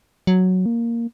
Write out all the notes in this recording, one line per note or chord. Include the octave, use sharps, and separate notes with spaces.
F#3
A#3